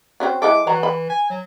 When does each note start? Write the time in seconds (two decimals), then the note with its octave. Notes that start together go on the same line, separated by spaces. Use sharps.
0.20 C4 C#4 F#4
0.42 G#3 E4 A4 D6
0.67 E3 F#3 F#4 A#5
0.83 B5
1.10 G#5
1.30 F#3